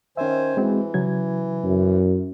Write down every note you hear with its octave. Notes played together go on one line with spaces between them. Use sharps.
D#3 C#4 C5 E5 G#5
E3 G#3 C4 F#4
C#3 F#3 G#6
F#2